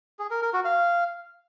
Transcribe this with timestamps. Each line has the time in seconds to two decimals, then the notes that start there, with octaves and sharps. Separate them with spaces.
0.19 G#4
0.31 A#4
0.42 A#4
0.53 F#4
0.65 F5